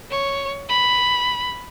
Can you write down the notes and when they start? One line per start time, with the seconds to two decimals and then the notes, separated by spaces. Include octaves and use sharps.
0.11 C#5
0.69 B5